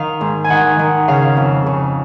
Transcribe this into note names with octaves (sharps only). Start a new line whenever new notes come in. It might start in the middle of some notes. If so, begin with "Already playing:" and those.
Already playing: D#3 F5
G#2
G#5
D#3 F#5
D#3
C#3 F5
F2
C#3